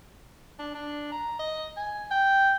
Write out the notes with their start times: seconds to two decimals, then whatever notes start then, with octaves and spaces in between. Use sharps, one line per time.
0.59 D4
0.74 D4
1.12 A#5
1.39 D#5
1.77 G#5
2.11 G5